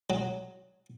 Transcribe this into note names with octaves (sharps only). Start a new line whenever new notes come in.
F#3